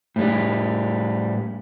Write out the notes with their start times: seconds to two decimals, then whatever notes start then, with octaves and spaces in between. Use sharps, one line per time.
0.16 A2 G3